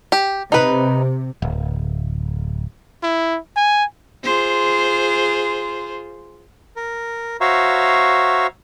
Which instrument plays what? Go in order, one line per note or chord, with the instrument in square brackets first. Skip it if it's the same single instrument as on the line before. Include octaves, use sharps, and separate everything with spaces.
[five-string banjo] G4
[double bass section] C3 [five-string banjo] D#4 B4
[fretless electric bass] D1
[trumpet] E4
G#5
[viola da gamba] F4 G#4 C5
[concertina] A#4
F#4 C5 C#5 E5 F5 A#5